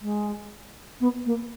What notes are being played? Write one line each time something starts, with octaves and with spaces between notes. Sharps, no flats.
G#3
B3
A#3